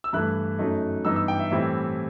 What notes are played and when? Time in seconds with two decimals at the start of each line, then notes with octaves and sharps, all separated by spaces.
0.04 E6
0.13 G2 E3 A3 E4 F#6
0.59 F#2 F#3 A3 D#4
1.05 G2 E3 B3 D#4 E6
1.16 E6
1.28 G5
1.39 E5
1.50 A2 E3 G3 C4 E4 E5